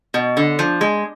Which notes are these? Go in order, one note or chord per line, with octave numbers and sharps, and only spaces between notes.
B2
D3
F3
G#3